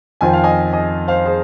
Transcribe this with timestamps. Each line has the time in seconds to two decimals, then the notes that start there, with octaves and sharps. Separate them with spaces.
0.21 F2 D#3 C4 F4 G#5
0.33 F5
0.44 D#5 G#5
0.73 D#5 G#5
1.08 C5 F5
1.25 G#4 C5